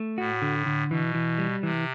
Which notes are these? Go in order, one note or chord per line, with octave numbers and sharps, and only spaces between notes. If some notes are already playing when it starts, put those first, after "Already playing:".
Already playing: A3
A2 F#4
D3
D3
B2 E3
E3
G3
C3 E3